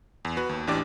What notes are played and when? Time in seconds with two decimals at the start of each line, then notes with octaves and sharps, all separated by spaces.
0.25 E2
0.37 F#4 B4
0.49 D#2
0.67 A1 E3 D4 G4 D5